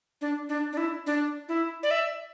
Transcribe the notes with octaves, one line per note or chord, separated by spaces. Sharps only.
D4
D4
D4
E4
D4
E4
D5
E5